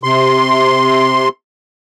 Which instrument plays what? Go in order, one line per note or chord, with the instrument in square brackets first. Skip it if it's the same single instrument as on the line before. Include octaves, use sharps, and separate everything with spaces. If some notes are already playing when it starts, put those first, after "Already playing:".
[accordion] C3 C6